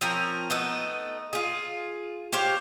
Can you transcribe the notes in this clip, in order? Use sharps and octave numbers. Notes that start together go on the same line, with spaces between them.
F3 C4 C#4 A#4
A3 B3 D#4 A4
F4 G#4
G4 C5 C#5 F5